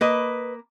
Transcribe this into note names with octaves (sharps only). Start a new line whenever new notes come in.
A#3 B4 D#5